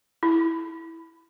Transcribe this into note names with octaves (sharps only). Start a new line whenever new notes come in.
E4